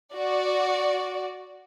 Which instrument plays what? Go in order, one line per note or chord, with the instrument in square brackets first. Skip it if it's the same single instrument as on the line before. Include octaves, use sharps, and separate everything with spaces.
[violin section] F#4 D5